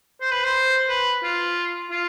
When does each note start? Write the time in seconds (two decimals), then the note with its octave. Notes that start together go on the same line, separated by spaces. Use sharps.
0.21 C5
0.31 B4
0.44 C5
0.88 B4
1.23 F4
1.91 F4